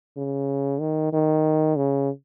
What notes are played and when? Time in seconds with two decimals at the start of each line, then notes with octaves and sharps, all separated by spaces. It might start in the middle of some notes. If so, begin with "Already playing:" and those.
0.17 C#3
0.80 D#3
1.13 D#3
1.76 C#3